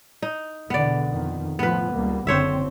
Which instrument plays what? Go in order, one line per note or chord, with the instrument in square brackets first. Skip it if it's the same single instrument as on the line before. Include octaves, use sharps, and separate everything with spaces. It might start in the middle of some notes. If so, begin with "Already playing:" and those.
[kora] D#4
[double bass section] E2 B2 D3 [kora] B3 D5
[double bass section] F2 D#3
[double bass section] A2 F3 [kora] B3 B4
[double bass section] C#2 G3 A#3
[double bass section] F#1 D3 C4 [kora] C5 C#5 E5